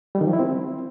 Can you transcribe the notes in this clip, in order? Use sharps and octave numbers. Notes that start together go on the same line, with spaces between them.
G3
D#3
F3
E4
C4